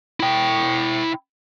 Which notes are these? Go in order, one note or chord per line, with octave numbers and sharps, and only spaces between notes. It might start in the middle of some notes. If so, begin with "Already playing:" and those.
E4 G5